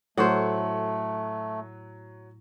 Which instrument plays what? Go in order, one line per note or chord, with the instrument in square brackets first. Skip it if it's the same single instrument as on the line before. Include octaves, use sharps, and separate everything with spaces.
[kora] A2 C5 [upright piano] F#3 F#5 C#6 [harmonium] A3